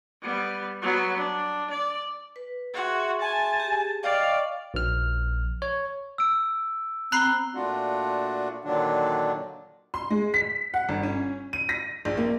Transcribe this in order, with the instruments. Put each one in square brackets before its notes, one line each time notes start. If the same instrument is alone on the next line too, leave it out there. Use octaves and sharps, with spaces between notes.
[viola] G3 B3
F#3 B3
D4
D5
[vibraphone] B4
[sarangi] F#4 [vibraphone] G#4 E5 C6
[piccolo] G#5 [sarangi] A5
[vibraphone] G4 G#4
[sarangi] D5 [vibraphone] D#5 G5 C#6 [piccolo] F5
[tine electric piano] A#1 F6
C#5
[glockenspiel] E6 D7
[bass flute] C4 [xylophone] A#5 B5 C7 [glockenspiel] F#6 G7
[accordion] A#2 A3 D4 F4 F#4
A#2 D3 D#3 F#3 D4
[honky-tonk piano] C6
G#3
B6
F#5
G1
C#4
D#7
A#6
A#1
A#3